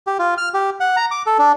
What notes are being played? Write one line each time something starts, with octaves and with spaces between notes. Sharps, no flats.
G4
F4
F6
G4
F#5
A#5
D6
A4
D4